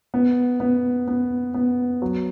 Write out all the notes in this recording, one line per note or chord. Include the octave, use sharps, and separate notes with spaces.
B3
B3
B3
B3
F#3